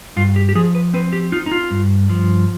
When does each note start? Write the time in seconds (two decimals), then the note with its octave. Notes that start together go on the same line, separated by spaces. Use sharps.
0.16 G2 F4
0.36 G4
0.49 G4
0.55 F3 G#4
0.75 B4
0.94 C4 B4
1.13 G4
1.32 D#4 F4
1.46 D#4
1.52 F4
1.71 G2
2.10 F3